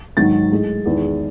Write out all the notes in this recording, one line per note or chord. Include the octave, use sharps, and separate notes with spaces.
G#2 D#3 F#3 A6
A2 G#3
E2 D#3 G#3